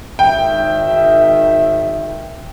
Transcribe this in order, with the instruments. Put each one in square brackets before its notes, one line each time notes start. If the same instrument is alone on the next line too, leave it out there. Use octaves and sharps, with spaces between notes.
[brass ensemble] G#1 D#3 E5 [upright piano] G5